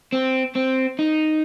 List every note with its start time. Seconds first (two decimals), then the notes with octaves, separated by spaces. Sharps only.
0.12 C4
0.56 C4
0.99 D#4